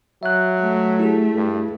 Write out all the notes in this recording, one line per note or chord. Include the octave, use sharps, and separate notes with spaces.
F#3 E5 F#6
A3
E4 G4 G#4
G2